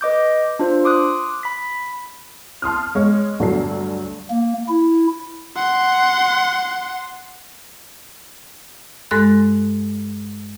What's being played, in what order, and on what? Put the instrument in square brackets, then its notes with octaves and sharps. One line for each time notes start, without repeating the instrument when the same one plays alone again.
[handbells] B4 D#5 D6 G6
D4 F4 C5
C6 D6 D#6 F#6
B5 B6
[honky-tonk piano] A5 C6 D#6 F6
G#3 C#5
D2 G2 F#3 A4 C7
[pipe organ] A#3
E4
[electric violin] F#5 C6
[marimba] G2 G#3 A4 C6 F#6